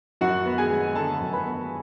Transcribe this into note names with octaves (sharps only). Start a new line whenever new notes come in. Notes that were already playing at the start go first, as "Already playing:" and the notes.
F#2 F#4 F#5
B3
G#4 G#5
G#3
D3 A4 A5
F#2
B4 B5
B3